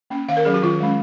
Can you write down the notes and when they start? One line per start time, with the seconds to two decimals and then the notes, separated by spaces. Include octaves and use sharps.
0.10 A#3 C#4
0.29 D#3 F5
0.37 A#4
0.45 F#3 C#4 G#4
0.54 F#4
0.62 D#3 F4
0.80 G#3 C#4